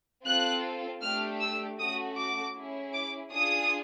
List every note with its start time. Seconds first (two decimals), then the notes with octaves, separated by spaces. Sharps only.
0.24 C4 F4 A4 F#6
1.01 A3 D4 G4 F6
1.40 E6
1.79 A3 C#4 F#4 D#6
2.16 D6
2.55 C#4 E4 G#4
2.94 D6
3.32 D4 F4 G#4 D#6